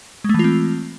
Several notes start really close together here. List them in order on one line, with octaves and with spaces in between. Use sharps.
G#3 A3 E3 F4 C4